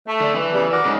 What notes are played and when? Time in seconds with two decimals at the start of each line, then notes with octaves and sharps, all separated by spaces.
0.07 A3
0.21 D3
0.35 E3
0.53 C#3 G3 B3
0.71 F#4 A#4 D5
0.85 G#2 C#3